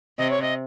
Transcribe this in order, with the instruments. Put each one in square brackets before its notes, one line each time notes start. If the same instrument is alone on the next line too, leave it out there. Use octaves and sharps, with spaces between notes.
[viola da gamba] C3 [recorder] D#5
[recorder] C#5
D#5